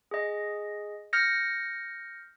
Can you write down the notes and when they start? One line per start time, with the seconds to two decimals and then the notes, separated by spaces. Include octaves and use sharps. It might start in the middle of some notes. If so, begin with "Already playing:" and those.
0.11 G#4 D#5
1.13 F6 G6 A#6 C#7